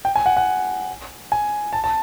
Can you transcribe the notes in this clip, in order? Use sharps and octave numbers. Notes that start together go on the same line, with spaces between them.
G5
G#5
F#5
F#5
G#5
A5
A5